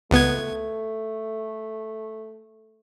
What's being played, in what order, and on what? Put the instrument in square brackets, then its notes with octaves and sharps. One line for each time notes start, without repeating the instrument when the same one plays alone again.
[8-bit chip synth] C#2 B3 G#6 [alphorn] A3